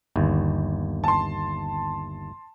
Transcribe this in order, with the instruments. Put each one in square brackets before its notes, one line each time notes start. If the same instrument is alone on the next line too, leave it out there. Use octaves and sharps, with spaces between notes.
[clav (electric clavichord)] G1 D#2
[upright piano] A5 C6